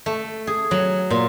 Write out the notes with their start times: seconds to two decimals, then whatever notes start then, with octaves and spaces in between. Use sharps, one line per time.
0.06 A3
0.47 G#4
0.71 F#3
1.10 A#2